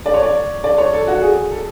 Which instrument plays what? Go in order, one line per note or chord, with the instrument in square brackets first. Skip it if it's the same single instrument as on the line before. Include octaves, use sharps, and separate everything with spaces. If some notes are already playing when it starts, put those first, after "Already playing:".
[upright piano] D5
C#5
D5
D5
C#5
A4
F#4
G#4
A4